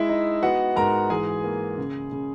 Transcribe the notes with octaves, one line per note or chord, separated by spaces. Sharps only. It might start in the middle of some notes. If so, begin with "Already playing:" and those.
Already playing: G#3 E4 E5
D#4
B3 F#4 F#5
G#2 A#4 A#5
E3 G#4 G#5
A#3
C#3
C#3